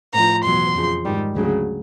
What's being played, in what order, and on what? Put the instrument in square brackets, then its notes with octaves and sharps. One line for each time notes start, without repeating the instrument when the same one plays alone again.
[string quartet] A2 F3 A#5
E2 B2 F#3 C6
F2 C#3 F3
G#2 D#3 G3
D2 C#3 F#3